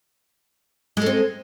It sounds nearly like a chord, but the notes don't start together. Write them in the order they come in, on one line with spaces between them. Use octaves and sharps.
G#3 A4 C4